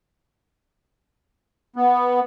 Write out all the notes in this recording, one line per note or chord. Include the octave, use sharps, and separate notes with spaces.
B3